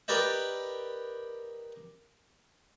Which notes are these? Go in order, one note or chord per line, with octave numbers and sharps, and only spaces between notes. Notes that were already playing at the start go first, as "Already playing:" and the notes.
G4 A#4 B4 D5 D#5 G5